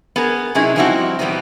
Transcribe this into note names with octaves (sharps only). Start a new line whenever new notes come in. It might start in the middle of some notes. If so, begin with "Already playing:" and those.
B3 G#4 A#4
C3 F#3 C#4 D#4 E4 G#4
F3 G3 C4 D#4 E4 F#4
B2 E3 G3 B3 C4 D#4